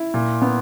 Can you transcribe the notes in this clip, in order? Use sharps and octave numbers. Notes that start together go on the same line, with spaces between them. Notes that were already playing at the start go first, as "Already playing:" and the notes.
Already playing: E4
A#2
B3